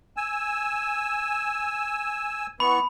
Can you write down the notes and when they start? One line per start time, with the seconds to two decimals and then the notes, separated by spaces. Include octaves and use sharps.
0.17 G#5 E6
2.60 E3 B3 B5 C#6